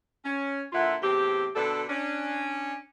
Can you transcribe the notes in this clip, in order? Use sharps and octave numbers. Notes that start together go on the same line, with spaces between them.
C#4
A#2 D3 E4 F4 E5 F#5
E2 A2 C4 G4
B2 D3 D4 A4
C#4 D4